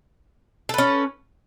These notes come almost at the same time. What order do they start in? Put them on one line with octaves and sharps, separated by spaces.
A4 B4 C#4